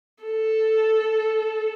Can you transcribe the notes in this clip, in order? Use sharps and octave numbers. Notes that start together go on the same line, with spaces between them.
A4